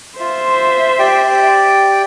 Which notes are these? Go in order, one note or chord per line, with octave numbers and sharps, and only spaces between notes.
F4 C5 E5
G4 D5 G5